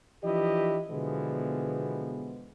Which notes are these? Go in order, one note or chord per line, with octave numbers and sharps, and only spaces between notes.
E3 F3 D4 E4 G4 D#5
B2 D3 E3 F3 G#3 B3